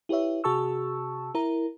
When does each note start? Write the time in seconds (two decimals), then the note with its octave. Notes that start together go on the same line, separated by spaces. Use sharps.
0.09 E4 G4 B4 C#5 E5
0.44 C3 F#4 G#4 A5 C#6 E6
1.35 E4 A#4 A#5